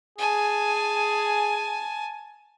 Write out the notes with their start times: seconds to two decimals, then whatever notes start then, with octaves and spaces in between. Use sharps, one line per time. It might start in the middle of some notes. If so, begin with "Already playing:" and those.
0.19 G#4 G#5 A5